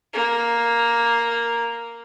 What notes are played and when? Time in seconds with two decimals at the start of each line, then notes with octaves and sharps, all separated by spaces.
0.14 A#3